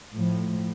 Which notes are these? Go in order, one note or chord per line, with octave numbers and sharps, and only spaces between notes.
A2 F3